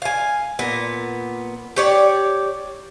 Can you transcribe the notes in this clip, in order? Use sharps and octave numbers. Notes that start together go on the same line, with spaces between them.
F5 G#5
A#2 B3
G4 C#5 D5